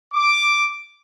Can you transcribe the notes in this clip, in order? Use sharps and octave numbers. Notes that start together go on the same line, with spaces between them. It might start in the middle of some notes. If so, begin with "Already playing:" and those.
D6